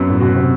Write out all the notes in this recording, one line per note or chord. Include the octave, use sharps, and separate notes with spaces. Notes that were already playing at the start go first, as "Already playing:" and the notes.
Already playing: F#2 B3
A2
B2 F#4
C3